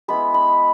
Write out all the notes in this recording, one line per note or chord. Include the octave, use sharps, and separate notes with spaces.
G#3 B3 E4 B5
B5